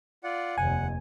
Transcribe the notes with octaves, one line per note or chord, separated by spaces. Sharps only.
F4 D5 F#5
F1 D#2 F#5 G#5